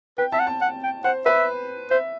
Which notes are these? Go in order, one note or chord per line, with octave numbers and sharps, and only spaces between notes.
B4 G5
E5 A5
F#5
A5
F#5
G5
C5 F#5
B4 E5
C5 E5